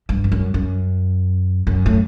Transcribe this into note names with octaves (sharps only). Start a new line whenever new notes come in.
G2
E2
F#2
F#2
F#2
A2